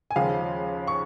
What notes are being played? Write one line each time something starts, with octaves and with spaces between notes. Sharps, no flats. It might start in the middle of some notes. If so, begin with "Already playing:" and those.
G#5
D#2 C#3 F3 G#3 F5
C#6